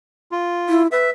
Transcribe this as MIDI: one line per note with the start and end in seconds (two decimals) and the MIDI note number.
0.32 0.82 65
0.69 0.87 64
0.92 1.09 71
0.92 1.10 76